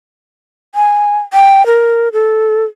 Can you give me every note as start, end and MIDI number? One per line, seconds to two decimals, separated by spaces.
0.75 1.19 80
1.33 1.65 79
1.66 2.09 70
2.13 2.64 69